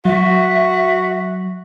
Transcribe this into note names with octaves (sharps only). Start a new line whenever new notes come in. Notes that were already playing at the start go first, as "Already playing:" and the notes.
F#3 F#4 E5